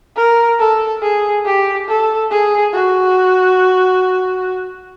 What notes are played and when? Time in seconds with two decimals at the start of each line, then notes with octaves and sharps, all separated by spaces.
0.17 A#4
0.60 A4
1.02 G#4
1.46 G4
1.88 A4
2.31 G#4
2.74 F#4